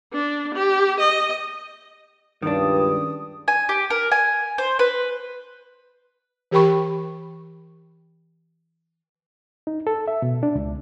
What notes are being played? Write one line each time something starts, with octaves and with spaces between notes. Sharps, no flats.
D4
G4
D#5
C#2 G2 D#3 D4 D#6
G#5
G4
A#4
G#5
C5
B4
E3 G4 A#4 G5 B5 C#6
D#4
A4
E5
B2
D4
C#2